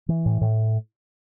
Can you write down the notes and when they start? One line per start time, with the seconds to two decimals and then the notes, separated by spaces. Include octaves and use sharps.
0.09 E3
0.26 A2
0.41 A2